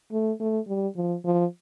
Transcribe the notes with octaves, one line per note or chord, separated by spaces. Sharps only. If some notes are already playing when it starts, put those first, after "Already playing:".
A3
A3
G3
F3
F3